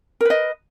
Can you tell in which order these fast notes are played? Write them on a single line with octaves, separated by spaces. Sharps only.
A#4 B4 D#5